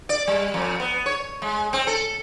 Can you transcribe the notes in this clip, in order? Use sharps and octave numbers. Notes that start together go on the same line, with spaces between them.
D5
G3
F2
B3
C#5
G#3
C4
A4